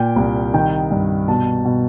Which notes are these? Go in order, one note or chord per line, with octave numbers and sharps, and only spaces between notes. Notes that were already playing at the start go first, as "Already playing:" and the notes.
Already playing: A#2 G5
C2
D#3 G5
G2
B2 A5
B2